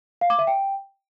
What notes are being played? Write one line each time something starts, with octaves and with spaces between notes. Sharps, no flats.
F5
D6
E5
G5